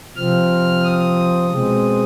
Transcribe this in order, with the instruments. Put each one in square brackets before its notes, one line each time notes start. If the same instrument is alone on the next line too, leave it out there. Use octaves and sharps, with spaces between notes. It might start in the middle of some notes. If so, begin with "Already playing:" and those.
[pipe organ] C3 F3 C4 F6
D#6
B2 G#3 C4